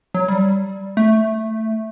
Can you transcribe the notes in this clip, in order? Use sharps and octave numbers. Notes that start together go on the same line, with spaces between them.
F#3
G3
A3